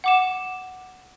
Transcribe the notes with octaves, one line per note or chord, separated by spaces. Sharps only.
F#5 D6 E7